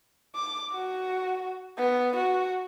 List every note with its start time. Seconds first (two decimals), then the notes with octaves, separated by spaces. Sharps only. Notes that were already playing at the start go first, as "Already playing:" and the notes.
0.35 D6
0.72 F#4
1.78 B3
2.16 F#4